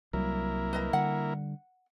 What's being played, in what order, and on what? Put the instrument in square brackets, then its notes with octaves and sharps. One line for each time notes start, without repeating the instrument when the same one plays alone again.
[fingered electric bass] C2 F#3 G3 [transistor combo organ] A#3 E4 A#4
[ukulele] B4 D#5 A#5
[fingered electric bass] D3 G3 [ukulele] F#5